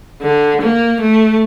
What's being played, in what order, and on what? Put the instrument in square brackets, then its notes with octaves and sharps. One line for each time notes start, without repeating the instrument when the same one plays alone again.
[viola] D3
A#3
A3